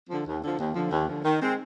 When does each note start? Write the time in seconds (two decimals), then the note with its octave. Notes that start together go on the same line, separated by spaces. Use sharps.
0.10 D3 F3
0.27 D#2
0.43 D3 F3
0.59 D#2
0.75 D3 F3
0.92 D#2
1.08 D3 F3
1.24 D#3
1.42 G#3 C4